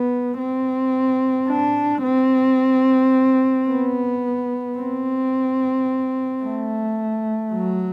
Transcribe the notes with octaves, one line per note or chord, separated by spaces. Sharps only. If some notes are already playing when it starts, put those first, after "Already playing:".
Already playing: B3
C4
D4
C4
B3
C4
A3
F#3